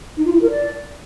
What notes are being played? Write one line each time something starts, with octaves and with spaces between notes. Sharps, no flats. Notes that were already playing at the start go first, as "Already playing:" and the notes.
D#4
F4
E4
A#4
D5